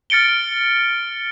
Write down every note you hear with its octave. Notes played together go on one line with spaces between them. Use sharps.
F6 A6 C#7 D7 G7